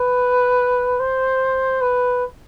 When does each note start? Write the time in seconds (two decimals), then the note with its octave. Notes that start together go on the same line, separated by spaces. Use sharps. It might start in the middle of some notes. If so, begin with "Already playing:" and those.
Already playing: B4
1.00 C5
1.81 B4